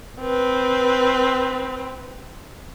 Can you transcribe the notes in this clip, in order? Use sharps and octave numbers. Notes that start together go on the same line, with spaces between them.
C4 B4